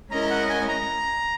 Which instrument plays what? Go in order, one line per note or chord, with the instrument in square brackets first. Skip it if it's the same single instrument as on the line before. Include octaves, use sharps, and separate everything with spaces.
[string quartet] G#3 C#4 E4 A#4 D#5 [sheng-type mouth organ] A#5
[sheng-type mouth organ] F#5
G#5
A#5